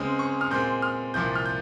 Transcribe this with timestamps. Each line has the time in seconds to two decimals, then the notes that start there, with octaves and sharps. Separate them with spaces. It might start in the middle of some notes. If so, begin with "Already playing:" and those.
Already playing: C#2 C#3 G#3 C4 D#6
0.19 C#6
0.41 F6
0.51 A#2 G#3 C4 G6
0.82 F6
1.14 C2 A#2 F3 G6
1.35 F6
1.46 G6